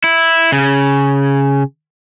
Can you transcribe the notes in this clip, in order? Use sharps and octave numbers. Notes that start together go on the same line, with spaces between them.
E4
C#3